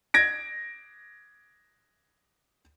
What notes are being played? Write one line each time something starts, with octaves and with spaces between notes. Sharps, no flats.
G#6 A#6 D7